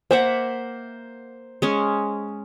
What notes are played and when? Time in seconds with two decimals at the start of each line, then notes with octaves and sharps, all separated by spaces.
0.11 A#3 C5 E5 F#5
1.62 G#3 C#4